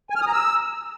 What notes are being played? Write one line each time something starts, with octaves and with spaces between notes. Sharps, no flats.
G#5
F6
D#6
A#5
E6